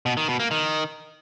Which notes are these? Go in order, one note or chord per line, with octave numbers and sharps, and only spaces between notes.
B2
D#3
B2
A#3
D#3